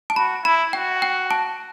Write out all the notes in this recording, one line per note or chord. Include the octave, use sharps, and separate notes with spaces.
A5
F#4 B5
E4 B5
F#4 G5
G5
A5